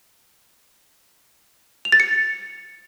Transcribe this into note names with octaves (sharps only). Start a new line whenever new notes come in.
F7
A6
C#7